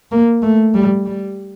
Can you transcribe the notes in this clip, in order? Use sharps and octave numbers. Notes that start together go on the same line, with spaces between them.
A#3
A3
G3
G3